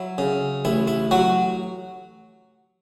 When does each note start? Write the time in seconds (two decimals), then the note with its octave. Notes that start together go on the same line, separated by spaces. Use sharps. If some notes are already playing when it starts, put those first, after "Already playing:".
Already playing: F#3 E4
0.18 C#3
0.65 A1 E4
0.88 E4
1.11 F#3 F#4